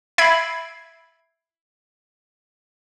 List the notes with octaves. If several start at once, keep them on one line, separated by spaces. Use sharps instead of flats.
E5 B5 E6 G#6 C7 D7